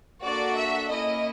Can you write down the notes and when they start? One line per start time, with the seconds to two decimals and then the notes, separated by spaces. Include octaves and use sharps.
0.22 A#3 D4 F#4 A4 D5
0.56 E5
0.89 A#3 C#4 E4 D#5